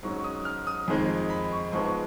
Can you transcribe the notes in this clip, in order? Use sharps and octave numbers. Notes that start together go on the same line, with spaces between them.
G#2 F#3 C#4 C#6
C#6
D#6
F6
D#6
F2 D#3 G#3 D#4
B5
C#6
G#2 F3 G#3 B3 C#6
C#6